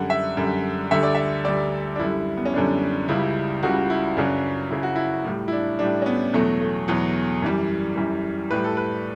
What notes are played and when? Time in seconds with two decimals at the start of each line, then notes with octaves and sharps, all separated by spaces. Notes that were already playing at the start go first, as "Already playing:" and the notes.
Already playing: F#2 D3 G3 F#5
0.10 E5
0.37 F#2 D3 G3
0.91 D2 D3 G3 E5
1.03 D5
1.15 E5
1.45 D2 D3 G3 D5
1.96 D4
1.99 F#2 D3 G3 E4
2.37 B3
2.45 C#4
2.54 F#2 D3 G3 D4
3.08 C#2 C#3 G3 E4
3.63 C#2 C#3 G3 F#4
3.90 E4
4.17 F#2 C#3 F#3 D4
4.70 F#2 C#3 F#3 E4
4.83 F#4
4.96 E4
5.25 A2 G3
5.48 E4
5.52 D4
5.79 A2 G3 D4
6.02 C#4
6.06 B3
6.34 E2 B2 F#3 A3
6.61 A3
6.88 E2 B2 F#3 B3
7.42 F#2 E3 G3
7.96 F#2 E3 G3
8.51 A2 G3 B4
8.64 A4
8.77 B4